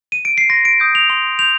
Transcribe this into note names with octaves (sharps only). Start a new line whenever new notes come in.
D#7
D7
C7
C6 A#6
D7
D#6 G6
F7
C6 F7
G6 F7